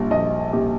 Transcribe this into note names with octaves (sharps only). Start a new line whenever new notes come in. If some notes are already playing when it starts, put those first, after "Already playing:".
Already playing: A#1 A#2 G3
A#1 D#5
A#2 G3 G4